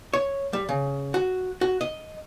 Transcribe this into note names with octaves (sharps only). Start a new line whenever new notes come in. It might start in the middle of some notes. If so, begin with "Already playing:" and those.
C#5
G3
C#3
F#4
F#4
D#5